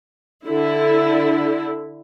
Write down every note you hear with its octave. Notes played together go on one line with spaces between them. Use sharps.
D3 E4